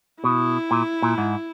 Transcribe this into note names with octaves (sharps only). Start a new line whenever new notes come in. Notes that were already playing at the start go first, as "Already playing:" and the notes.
B2 E4
A#2
A#2
G#2